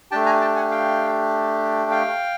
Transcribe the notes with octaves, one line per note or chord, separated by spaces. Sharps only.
A3 D4 G4 G5 A5
G#5 A#5
G5 A5
F#5 G#5
F5 G5
F5 G5